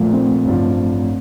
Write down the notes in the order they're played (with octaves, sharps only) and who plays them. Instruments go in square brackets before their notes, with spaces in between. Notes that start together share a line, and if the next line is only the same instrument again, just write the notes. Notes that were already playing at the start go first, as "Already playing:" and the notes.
Already playing: [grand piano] A#1 A#2 F3 [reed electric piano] A3
[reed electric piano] C4
[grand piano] A1 G2 F3